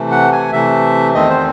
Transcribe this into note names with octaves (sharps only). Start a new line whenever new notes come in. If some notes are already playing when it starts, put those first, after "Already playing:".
Already playing: C3 E3 A3
F#5
G#5
C3 E3 A3 E5
E2 D#3 A3 C4 D#5
C5